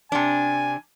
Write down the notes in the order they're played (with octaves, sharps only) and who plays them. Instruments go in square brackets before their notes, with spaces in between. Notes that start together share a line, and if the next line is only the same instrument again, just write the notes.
[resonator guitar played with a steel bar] C3 D4 [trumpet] G#5